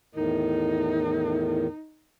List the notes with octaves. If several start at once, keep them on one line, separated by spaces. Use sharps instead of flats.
E2 A2 D#3 D#4